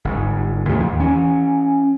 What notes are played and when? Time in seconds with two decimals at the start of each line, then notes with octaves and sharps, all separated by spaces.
0.05 G1 G#2
0.69 D#2 A2 C#3 F3
0.80 D#2
1.00 E3 C#4